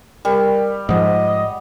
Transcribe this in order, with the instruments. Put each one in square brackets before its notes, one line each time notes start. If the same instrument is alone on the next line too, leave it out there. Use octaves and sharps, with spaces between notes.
[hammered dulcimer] G3 [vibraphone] A#4
[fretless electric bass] G#2 F3 [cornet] D#5 [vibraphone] F#5